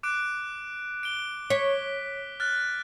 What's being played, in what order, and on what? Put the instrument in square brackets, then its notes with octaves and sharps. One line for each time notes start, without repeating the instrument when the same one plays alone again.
[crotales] D6 F#6 D7
D7 G7
[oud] C#5 [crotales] B6
[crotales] F6 F#6 A6